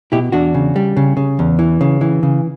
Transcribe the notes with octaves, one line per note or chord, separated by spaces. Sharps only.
B2 E4 G4
E2 D4 F#4
C#3
G3
C#3
C#3
E2
E3
C#3
E3
C#3